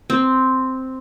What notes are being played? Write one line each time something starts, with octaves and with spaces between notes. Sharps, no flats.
C4